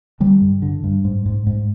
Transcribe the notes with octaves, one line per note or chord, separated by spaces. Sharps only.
D3 G3
G2
D3
G2
G#2
G#2
G#2